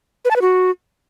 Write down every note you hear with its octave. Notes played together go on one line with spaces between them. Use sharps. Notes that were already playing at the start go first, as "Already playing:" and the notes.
B4
A5
B4
F#4